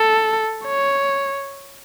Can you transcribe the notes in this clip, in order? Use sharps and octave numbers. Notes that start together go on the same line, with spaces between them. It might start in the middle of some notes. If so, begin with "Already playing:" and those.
Already playing: A4
C#5